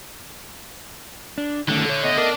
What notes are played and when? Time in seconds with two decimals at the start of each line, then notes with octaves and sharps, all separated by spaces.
1.38 D4
1.68 D3 D#3 A3 C#4
1.86 A4 C#5
2.02 A3 B3 D#5
2.18 D4 A#4 D5